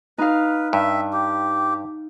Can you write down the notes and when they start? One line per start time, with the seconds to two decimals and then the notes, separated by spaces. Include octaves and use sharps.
0.18 D#4 B4 F5
0.73 G2 E5
1.13 G4